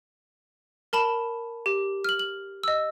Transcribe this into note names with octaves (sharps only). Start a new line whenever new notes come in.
A#4 A5 B5 E7
G4
F6 F#7
F#7
D#5 E6